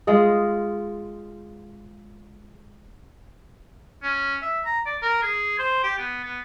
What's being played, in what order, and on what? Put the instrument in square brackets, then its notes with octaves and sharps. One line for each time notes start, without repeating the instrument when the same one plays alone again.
[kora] G#3 F4 D#5
[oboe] C#4
E5
A#5
D5
A#4
G#4
C5
G4
B3
B3